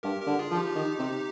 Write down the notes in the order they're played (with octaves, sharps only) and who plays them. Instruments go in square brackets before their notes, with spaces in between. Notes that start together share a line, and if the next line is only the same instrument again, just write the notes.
[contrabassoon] G2 [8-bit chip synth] G4 A#4
[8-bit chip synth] G4 A#4
[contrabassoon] D3
[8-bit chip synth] F4 G#4
[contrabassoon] F3 [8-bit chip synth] F4
[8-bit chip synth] D#4 G4
[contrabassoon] D#3
C3